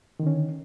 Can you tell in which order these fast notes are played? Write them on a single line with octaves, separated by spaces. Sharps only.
D#3 D3 C#4